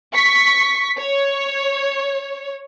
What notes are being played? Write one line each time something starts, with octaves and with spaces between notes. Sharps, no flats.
C#6 B6
C#5